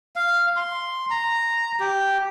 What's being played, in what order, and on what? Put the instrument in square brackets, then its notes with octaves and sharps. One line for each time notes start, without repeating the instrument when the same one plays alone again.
[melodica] F5
C6
A#5
G4